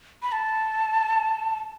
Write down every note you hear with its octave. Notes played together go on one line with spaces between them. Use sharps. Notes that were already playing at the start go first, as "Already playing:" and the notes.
B5
A5